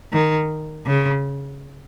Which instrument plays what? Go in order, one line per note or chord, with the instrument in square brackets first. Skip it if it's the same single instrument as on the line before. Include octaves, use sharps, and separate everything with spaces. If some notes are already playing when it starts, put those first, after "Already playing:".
[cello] D#3
C#3